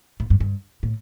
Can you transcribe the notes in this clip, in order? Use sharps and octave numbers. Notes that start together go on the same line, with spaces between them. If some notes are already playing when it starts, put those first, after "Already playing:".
A2
G2
G2
A2